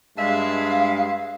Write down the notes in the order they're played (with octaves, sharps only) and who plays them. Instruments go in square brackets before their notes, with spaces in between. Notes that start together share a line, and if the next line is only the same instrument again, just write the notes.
[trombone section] G2 G#3 [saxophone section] D4 G#4 E5 [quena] F5